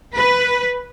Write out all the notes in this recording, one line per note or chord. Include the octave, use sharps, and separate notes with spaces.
B4